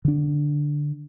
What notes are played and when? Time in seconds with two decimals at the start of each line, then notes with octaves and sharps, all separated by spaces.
0.05 D3 D4